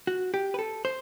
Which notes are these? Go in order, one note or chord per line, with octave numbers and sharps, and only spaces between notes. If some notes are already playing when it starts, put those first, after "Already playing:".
F#4
G4
B4
A4
C5